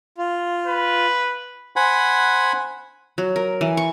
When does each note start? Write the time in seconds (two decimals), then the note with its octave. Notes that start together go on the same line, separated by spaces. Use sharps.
0.18 F4
0.67 B4
1.76 C5 F#5 G#5 B5
3.18 F#3
3.36 A#4
3.61 E3
3.77 C#6